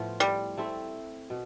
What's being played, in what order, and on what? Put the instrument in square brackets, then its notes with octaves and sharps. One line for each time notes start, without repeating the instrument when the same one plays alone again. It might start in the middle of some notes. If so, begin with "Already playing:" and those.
Already playing: [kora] A2 F3 B3 F4
[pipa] G3
[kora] A3 C4 E4 A4
B2